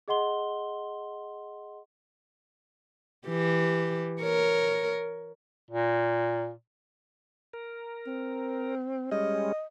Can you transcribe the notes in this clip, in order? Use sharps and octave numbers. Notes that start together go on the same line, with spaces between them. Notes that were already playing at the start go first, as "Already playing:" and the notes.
G#4 D#5 F#5 C6 G7
E3 G4
A#4 C#5
A#2
A#4
C4
G3 G#3 C#4 D#5